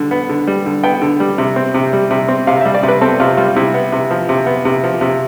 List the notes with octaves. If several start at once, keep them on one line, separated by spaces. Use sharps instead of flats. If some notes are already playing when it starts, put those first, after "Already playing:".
Already playing: D3 G3
B3
D3
G3
D3
B3 G5
D3
G3
C3
C4
C3
G3
C3
C4
C3 F5
G3 E5
D5
C3
B4
C4 A4
C3 F4
G3 F4
C3 E4
B3
C3
F3
C3
B3
C3
F3
C3